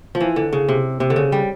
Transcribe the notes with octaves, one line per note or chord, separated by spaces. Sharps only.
F3
E3
D3
C#3
C3
C3
D3
C#3
G3